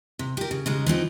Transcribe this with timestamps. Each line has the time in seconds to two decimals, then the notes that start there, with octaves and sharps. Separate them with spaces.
0.19 C3
0.37 G4 A#4
0.51 C#3
0.66 C#3 G#3 D#4
0.86 E3 F3 C4 D#4